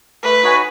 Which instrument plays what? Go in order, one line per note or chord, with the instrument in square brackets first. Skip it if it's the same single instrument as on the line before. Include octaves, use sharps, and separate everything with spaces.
[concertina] A3 [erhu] B4
[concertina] D#4 F#4 C#5 G#5